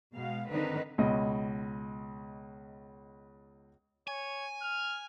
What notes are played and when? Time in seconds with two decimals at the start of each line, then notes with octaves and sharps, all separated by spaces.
0.13 B2 G#3 F5
0.50 D3 D#3 C4 D#4 B4
0.98 C#2 B2 D#5
4.08 C#5 G#5
4.62 F6